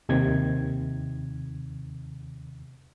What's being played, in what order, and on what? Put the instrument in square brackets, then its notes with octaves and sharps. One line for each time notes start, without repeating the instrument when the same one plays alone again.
[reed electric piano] D#2 C3 D#3 G#6